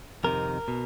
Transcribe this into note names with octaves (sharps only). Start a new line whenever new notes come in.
F2 C3 D#3 A#4
B2